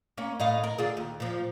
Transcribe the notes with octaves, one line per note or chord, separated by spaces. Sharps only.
A#3 C#4
A2 D#5 F5
A#4
D3 F4 G#4
D#2
A#2 F3